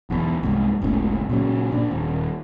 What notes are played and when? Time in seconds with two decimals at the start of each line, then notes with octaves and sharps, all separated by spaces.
0.10 B1 E2
0.43 C2 G#2
0.82 F#1 C#2 A2
1.29 A#2 C#3 F#3
1.72 A#2 D4
1.91 D#1